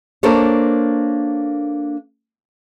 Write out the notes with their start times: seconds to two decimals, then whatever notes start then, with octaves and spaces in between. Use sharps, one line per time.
0.23 A#3 D4 A4 A#4 C5 C#5